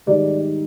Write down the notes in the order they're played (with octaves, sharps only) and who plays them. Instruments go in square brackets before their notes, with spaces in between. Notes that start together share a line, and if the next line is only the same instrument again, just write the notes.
[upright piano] G#2 D#3 G3 D5